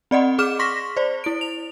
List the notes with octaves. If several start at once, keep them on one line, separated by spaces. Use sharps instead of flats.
C4 D5 D#5 F#5
G#4 D6 F6 E7
C6 C#6 A#6 B6
C5 D5
E4 D7
F7